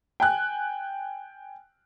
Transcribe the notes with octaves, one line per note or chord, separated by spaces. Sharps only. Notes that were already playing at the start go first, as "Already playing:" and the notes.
G5 G#5 F#6